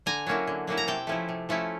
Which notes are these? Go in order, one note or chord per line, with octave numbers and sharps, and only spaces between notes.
D3 G#5 A#5
F#3 A#3 C#4 E4
D3
F#3 A#3 C#4 E4
A#5
C3 G5 A5
F3 A3 C#4 E4
C3
F3 A3 C#4 E4